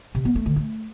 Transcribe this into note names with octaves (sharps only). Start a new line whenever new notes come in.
C3
B3
A3
D3
A3